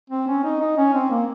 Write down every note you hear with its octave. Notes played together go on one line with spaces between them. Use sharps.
C4
C#4
D#4
D#4
C#4
C4
A#3